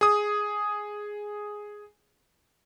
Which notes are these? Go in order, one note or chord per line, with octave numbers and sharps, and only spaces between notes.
G#4 D#6